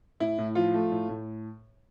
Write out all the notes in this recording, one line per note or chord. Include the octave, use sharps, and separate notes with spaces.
A2 E4
A2
F3 F4
A3
A2
A2